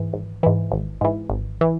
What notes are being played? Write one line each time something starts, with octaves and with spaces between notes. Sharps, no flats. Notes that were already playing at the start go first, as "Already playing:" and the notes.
Already playing: G#2 E3
G#1
G#2 E3
G#1
G#2 E3
G#1
E3